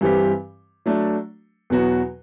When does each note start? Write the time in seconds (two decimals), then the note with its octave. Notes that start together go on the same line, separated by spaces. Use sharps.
0.01 G2 E3 G3 C4 G4
0.86 F#3 A3 D4
1.70 E2 B2 F#3 B3 F#4